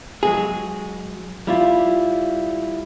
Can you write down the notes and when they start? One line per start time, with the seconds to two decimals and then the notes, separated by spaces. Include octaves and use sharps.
0.23 F#3 G#3 G#4
1.47 G3 E4 F4